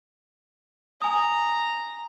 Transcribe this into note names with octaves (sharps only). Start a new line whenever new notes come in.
G#5 A#5 D#6